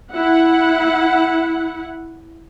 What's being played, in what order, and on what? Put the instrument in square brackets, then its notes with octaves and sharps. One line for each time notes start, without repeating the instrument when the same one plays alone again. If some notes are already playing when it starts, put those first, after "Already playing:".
[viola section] E4 F#5